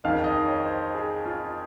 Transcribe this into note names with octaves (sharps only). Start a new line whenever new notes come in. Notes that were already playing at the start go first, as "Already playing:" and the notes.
F2 D#3 G#3 F5
D#5
C#5
C5
G#4
F4